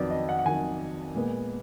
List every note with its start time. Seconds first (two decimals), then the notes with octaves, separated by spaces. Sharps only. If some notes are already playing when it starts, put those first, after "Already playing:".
Already playing: F2 D#3 F#3 B4 D5
0.11 D#5
0.29 F#5
0.39 F#5
0.45 F2 D#3 F#3 G#5
1.15 A#2 G#3 B3